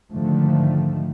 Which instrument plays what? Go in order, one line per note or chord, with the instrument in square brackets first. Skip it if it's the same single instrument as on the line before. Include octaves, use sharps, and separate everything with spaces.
[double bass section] G#2 D3 D#3 F3 A3